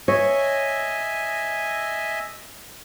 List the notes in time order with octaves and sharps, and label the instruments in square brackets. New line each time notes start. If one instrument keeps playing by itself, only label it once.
[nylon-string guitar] C#5 [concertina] D#5 E5 G#5